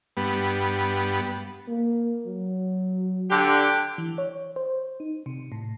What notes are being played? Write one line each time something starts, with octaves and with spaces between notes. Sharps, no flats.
G2 B3
A#3
F#3
D3 G4
E3
C#5
C5
D#4
C3
A2